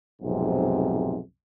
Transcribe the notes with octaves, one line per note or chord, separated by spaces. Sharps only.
B1 F2 G#2 C3